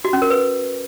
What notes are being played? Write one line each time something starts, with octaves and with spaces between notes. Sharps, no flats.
F#4
C#4
A#4
B4